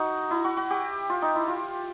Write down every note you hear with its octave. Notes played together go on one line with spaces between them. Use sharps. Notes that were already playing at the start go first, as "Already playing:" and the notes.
Already playing: D#4 F#4
E4
F#4
F#4
G4
F4
D#4
E4
F4